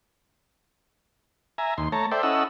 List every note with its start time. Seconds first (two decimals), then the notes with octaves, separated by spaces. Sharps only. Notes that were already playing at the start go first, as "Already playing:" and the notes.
1.58 E5 G#5 A#5
1.78 D#2 C6
1.92 A3 C#5 A5 A#5
2.11 A4 C5 D5 E5 G5
2.23 C#4 E4 A4 D#5 F#5 E6